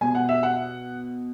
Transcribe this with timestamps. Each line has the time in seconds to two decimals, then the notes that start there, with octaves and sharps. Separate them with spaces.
0.01 B2 G#5
0.15 F#5
0.29 E5
0.43 F#5